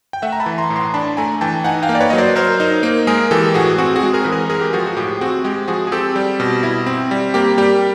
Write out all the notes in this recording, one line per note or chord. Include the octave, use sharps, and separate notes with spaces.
G5
A3 E5 F#5
A#5
A5 B5
E3
A#5 C6
A2
A#5 C6
D4 A5 B5
A3 G#5 A#5
E3 G5 A5
D#4 F#5 G#5
F5 G5
A#3
D5
B4 C#5
F#3 D#5
C5 D5
F#3 A#4 C5
D#4
A#3
G#3 G#4 A#4
E3 G4 A4
A2 F#4 G#4
C4 F#4
F#4 G#4
G#3
G#4 A#4
E3 B4
G#4 A#4
G#3 G#4 A#4
G4
F3 F#4 G#4
F#4
A2 G4
C4 F#4 G#4
G#3 G4
F3 F#4 G#4
G#4
C4 G4 A4
G3
B2
E4
C4
G3
A#3 G4
G3 G4